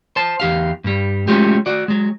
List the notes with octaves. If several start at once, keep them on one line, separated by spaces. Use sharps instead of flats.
C5 A5
E2 G4 F5
G2 G3
F#3 G#3 A3 C#4 F4 G4
F#4 D5
F#3 G#3